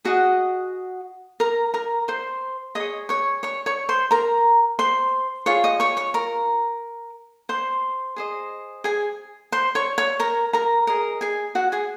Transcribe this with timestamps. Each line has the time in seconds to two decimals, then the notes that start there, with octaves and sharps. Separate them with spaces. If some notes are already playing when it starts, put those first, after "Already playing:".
0.05 F#4 G#4 D#5 F#5
1.40 A#4 A#5
1.74 A#4 A#5
2.08 C5 C6
2.75 G#4 C#5 D#5 D#6
3.09 C#5 C#6
3.43 C#5 C#6
3.66 C#5 C#6
3.89 C5 C6
4.11 A#4 A#5
4.79 C5 C6
5.46 F4 G#4 C#5 C#6
5.64 D#5 D#6
5.80 C#5 C#6
5.97 C#5 C#6
6.14 A#4 A#5
7.49 C5 C6
8.16 G#4 C5 D#5
8.84 G#4 G#5
9.52 C5 C6
9.75 C#5 C#6
9.98 C#5 C#6
10.19 A#4 A#5
10.53 A#4 A#5
10.87 G#4 A#4 D#5 A#5
11.21 G#4 G#5
11.55 F#4 F#5
11.72 G#4 G#5